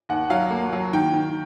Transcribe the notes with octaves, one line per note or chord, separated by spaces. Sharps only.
D#2 F#5
F#3 F5
A#3
F#3
D#3 G5
D#3